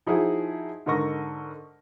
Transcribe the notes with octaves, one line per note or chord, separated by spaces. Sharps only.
F3 D#4 E4 F#4 G#4
G#2 D3 A#4 D#5 C#6 A#6